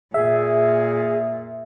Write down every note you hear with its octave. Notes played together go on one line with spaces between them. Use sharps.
A#2 G#4 E5